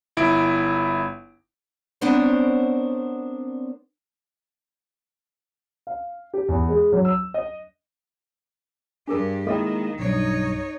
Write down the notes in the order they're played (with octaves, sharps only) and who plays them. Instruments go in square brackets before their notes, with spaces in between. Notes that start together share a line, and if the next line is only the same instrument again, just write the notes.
[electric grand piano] G1 E4 D7
[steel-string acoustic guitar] B3 C4 D4 A#4 C5 C#5
[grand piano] F5
G4
E2
G#3
F#3
E6
D#5
[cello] G2 G4 [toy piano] D4 G#4 A#4
[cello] D#3 [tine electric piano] G#3 A#3 E4 [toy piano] A4 D#5 G5
[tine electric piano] B1 G2 [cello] D#4 C#5